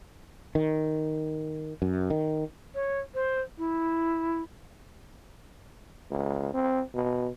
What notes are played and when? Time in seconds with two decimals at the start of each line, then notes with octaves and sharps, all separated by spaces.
0.55 D#3
1.82 F#2
2.10 D#3
2.75 C#5
3.15 C5
3.58 E4
6.11 C#2
6.53 C4
6.95 B2